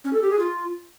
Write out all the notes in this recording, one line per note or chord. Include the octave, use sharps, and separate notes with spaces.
C#4
A4
G4
G#4
F4